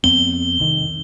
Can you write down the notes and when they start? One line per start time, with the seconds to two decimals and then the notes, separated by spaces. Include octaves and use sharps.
0.04 F2 B3 C4 G7
0.60 C2 D#3